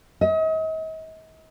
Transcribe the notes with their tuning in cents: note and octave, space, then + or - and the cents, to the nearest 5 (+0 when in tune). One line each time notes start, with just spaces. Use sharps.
D#5 +40